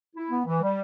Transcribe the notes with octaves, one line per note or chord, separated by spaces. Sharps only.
E4
B3
E3
G3